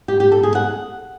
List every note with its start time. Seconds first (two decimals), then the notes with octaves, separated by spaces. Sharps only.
0.08 G4
0.20 G4
0.32 A4
0.43 G#4
0.55 F#5